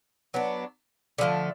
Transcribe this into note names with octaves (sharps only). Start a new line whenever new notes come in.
F#3 B3 D4
D3 F3 A3